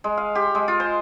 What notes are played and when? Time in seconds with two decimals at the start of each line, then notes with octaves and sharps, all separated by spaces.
0.04 G#3
0.17 F5
0.35 G4
0.55 G#3
0.68 F4
0.80 C5